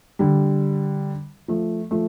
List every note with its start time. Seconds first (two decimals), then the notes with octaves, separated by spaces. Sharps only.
0.19 D3 G3
1.48 F3 A3
1.91 F3 A3